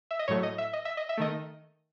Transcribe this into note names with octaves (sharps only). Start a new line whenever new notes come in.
E5
D#5
A2 F#3 A3 C#5
D#5
E5
D#5
E5
D#5
E5
D#3 A3 D#5